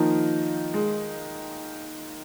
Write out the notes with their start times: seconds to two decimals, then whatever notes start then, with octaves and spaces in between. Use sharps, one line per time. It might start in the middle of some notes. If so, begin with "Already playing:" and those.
Already playing: D#3 F3 A#3 D#4
0.74 G#3